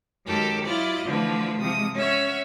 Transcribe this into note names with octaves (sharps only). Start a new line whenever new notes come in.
F#2 D#3 G#3 G4 A4 A#5
F#3 E4 F4 D5 D#5
D3 E3 F3 A3 B4
C3 F3 G#3 D#6
C#4 C#5 E5 F#5